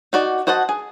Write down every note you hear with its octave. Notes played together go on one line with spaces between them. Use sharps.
D#4 F#4 D5
F#4 C5 D#5 F#5 A5
G#4